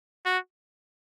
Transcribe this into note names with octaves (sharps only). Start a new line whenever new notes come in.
F#4